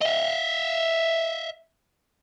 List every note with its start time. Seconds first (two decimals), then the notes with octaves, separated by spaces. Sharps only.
0.01 D#5 E5